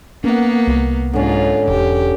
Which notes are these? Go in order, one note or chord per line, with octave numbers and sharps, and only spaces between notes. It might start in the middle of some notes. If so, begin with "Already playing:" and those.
A#3 B3 C#4 A#4 F#5
C2
G#2 D3 C#4 F4
E1 G4